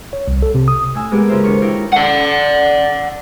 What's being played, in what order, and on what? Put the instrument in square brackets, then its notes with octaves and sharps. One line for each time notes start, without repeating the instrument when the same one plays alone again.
[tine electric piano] C#5
C2
A4
C3
D#6
[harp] A2 G#5 E6
G#3 A#3 B3 G4 G#4
C#3 F4 A#4 C5 E5
E2 D#3 D4 C#5 C#6
D#4 E4 A#4 C#5 F5 G5
[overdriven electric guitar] D5 F#5